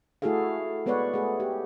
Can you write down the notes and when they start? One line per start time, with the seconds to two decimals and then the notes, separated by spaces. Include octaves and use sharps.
0.22 A3 E4 F#4 G#4 A4 F5
0.86 G#3 B3 B4 C#5 D5 F#5
1.14 A3 G#4
1.40 G4